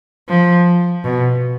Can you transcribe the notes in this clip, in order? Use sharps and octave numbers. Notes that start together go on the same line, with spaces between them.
F3
B2